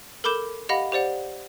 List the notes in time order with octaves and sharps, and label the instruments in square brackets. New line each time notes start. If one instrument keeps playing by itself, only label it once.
[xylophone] A4 A#4 B5 D6 G6 E7
G4 D#5 F5 F#5 B5 A#6
G4 C5 D5 F#5